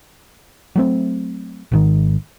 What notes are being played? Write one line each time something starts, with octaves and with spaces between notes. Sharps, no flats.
F#3 A3 C4
G#1 G#2 D#3